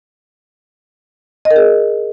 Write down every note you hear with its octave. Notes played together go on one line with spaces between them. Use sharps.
D#5
A#4
G#4